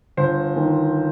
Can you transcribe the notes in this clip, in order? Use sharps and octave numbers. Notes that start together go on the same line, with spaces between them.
G1 C5
D#3